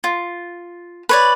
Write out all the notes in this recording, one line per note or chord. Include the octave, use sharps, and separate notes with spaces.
F4
B4 C#5 D5